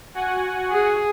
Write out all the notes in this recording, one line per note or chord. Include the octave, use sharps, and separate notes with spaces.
F#4 F#5 G#5
G#4